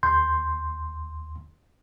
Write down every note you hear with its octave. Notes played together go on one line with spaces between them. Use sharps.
D#2 C6 G6